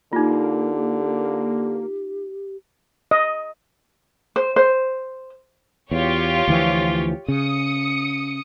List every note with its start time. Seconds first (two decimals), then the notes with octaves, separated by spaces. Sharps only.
0.13 D3 A#3 D#4 F4 G4
3.11 D#5
4.36 C5
4.56 C5
5.91 E2 F4 G4 C#5
6.48 D2 E3 F3
7.28 C#3 D#6 C#7